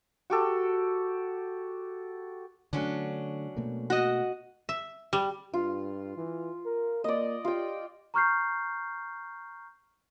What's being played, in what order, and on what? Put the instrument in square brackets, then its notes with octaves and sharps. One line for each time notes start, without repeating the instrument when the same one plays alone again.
[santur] F#4 G4 A4
[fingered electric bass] D3 A3 [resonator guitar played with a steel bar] F#3 C#4 D4
[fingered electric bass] B2 A3 A#3
[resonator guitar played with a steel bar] F#4 D#5
[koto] E5
G3
[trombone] G2 [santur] F4
[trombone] E3
A#4
[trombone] A#3 [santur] D5 D#5
[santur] F4 G5 [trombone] G4
[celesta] A#5 C#6 F6 G6 C7